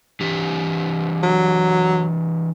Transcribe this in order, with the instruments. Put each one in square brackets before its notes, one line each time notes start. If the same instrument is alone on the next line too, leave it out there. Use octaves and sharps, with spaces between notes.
[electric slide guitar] E3 D4 G4
[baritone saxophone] F#3